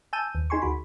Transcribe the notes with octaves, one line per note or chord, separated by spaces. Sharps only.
G#5 A5 E6 G6 D#7
D#2
D#4 G#4 G#5 C6 C#6
D2 F#4 B5